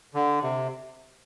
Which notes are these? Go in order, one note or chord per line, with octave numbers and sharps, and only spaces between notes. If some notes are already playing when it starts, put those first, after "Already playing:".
D3
C3